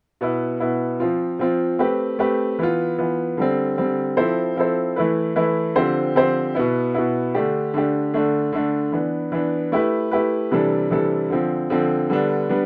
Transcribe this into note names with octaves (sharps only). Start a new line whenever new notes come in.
B2 B3 E4
B2 B3 E4
F3 C4 F4
F3 C4 F4
A3 C4 G4 B4
A3 C4 G4 B4
E3 B3 F4
E3 B3 F4
D3 G3 C4
D3 G3 C4
F3 C4 E4 A4 C5
F3 C4 E4 A4 C5
E3 A3 E4 B4
E3 A3 E4 B4
D3 F3 C4 G4 C5
D3 F3 C4 G4 C5
B2 B3 E4
B2 B3 E4
D3 A3 D4 G4
D3 A3 D4 G4
D3 A3 D4
D3 A3 D4
E3 B3 D4
E3 B3 D4
A3 E4 G4 B4
A3 E4 G4 B4
C3 E3 G3 D4 A4
C3 E3 G3 D4 A4
D3 F3 C4
D3 F3 C4
D3 G3 B3 D4
G3 B3 D4